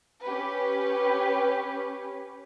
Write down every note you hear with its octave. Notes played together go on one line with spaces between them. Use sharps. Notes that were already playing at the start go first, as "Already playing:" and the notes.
C#4 G4 B4